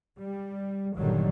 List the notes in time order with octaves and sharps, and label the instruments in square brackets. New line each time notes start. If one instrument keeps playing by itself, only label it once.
[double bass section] G3
G1 A#2 D3 D#3 F#3 G3